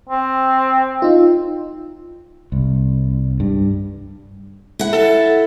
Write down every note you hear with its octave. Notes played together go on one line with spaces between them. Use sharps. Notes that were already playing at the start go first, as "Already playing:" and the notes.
C4
D#4 F4
C2
G2
E4 F#5
A4